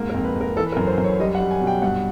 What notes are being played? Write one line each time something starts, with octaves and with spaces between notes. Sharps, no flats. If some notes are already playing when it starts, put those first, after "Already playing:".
Already playing: G#2 A#3
A#4
F2
B4
F2
A#4
E3 A4
B4
A#4
F#2
C5
F#2
C#5
G3 D#5
F#5
G3
G#5
B2
G5
G2 F#5